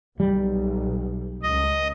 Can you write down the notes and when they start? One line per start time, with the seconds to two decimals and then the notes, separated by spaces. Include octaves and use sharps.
0.20 B1 G3
1.43 C#2 D#5